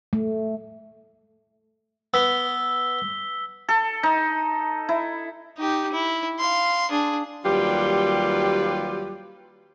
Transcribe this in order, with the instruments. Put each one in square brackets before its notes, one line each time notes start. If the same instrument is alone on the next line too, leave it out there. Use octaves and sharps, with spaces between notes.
[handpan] A3
[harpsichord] B3 [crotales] E6 B6 G7
[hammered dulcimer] A4
D#4
E4
[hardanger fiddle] D#4 G4
E4
F5 C6
D4 G#4
[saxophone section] D#2 F#3 G3 F4 G4 B4